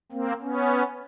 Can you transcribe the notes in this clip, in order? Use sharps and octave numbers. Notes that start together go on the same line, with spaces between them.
A#3 C4
B3 C#4